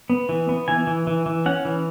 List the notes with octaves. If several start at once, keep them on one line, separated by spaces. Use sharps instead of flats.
B3
E3
B3
E3 G#5
E3
E3
E3
C#4 F#5
E3